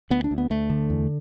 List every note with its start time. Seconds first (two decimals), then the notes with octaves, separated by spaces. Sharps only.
0.10 D2 B3
0.24 D4
0.31 D2
0.38 B3
0.50 D2 A3
0.70 D3
0.90 E2